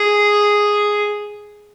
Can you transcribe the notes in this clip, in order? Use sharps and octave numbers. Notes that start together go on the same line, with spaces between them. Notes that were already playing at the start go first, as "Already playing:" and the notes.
Already playing: G#4